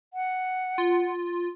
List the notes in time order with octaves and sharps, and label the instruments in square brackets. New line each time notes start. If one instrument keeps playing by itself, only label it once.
[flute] F#5
[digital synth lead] F4